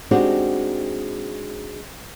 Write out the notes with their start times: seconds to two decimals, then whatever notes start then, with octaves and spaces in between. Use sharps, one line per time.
0.11 G#3 C4 D4 D#4 F#4 G4